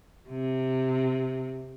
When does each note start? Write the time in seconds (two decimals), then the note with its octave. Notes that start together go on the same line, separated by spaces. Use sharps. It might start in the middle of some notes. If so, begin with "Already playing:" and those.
0.29 C3